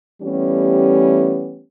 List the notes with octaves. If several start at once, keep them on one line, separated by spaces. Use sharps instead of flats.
E3 G3 A3 B3 C#4 G4